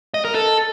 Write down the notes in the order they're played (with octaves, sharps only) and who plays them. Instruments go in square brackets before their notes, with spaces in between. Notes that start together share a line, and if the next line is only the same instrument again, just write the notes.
[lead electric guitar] D#5
A#4
A4